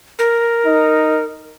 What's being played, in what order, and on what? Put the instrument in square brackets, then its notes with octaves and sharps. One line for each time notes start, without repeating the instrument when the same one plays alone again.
[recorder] A#4
[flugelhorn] D#4